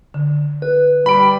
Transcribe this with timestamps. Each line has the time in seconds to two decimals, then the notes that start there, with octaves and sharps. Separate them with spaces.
0.14 D3
0.62 B4
1.06 G3 B5 D7